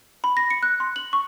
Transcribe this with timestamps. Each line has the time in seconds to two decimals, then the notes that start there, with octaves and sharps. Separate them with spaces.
0.24 B5
0.37 A#6
0.50 C#7
0.63 F#6
0.80 C6
0.96 F#7
1.13 C#6